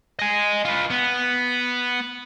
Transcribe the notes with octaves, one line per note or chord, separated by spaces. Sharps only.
D#5 G#5
F4 B4
B3